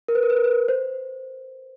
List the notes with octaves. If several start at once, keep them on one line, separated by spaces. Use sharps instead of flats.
A#4
B4
A#4
B4
A#4
B4
A#4
C5